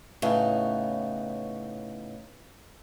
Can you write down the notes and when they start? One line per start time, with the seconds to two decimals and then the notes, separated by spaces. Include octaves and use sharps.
0.22 A2 C#3 B3 D#4